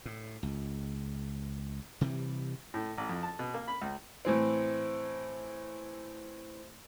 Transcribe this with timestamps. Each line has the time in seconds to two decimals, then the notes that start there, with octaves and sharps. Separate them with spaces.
0.05 A2
0.43 C#2
2.01 C3 E3 G3
2.74 A2
2.98 A1
3.09 F2
3.23 A5
3.39 B2
3.54 A#3
3.68 B5
3.82 C#2
4.25 A2 E3 C4